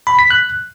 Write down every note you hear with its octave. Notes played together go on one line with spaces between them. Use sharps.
B5
B6
F#6